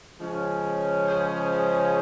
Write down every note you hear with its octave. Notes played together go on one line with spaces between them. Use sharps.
C#3 F3 G#3 C#4
G#4 C5